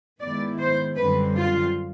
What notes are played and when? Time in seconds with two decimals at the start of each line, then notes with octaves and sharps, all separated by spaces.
0.20 G#2 D#3 G#3 B3 E4 D5
0.58 C5
0.96 F#2 D3 G3 C4 B4
1.35 F4